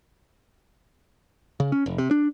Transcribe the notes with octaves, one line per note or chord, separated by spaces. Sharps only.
C#3
C#4
F1
C3
D4